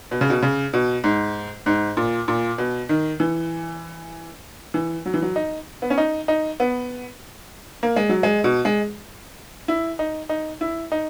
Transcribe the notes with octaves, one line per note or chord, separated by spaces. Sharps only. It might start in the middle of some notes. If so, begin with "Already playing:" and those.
B2
C#3
B2
C#3
B2
G#2
G#2
A#2
A#2
B2
D#3
E3
E3
F#3
E3
F#3
D#4
B3
C#4
D#4
D#4
B3
A#3
G#3
F#3
G#3
B2
G#3
E4
D#4
D#4
E4
D#4